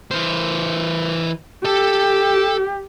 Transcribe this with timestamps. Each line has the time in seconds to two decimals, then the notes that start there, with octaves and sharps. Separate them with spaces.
0.11 E3 C5
1.65 G4 A4 A5